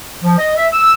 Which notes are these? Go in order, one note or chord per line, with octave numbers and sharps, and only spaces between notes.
F3
D#5
E5
E6